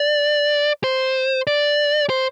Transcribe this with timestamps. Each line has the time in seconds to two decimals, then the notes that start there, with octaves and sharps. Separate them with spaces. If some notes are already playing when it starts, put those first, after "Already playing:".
Already playing: D5
0.84 C5
1.47 D5
2.10 C5